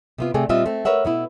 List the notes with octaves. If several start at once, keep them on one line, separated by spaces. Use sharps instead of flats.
C3 B3 F4
C3 A3 G#4 D5 G5
A#2 G3 C4 F4 D#5 E5
A3 C4
A#4 B4 C#5 E5 F#5
B2 B3 E4